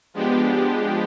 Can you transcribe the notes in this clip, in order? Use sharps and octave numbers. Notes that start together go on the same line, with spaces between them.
F3 G#3 B3 D4 G4